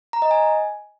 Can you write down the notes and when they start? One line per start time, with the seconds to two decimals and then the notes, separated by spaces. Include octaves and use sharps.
0.13 A#5
0.22 D#5
0.31 G#5